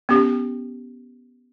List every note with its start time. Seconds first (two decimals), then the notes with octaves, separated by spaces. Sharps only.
0.09 B3 C#4 G4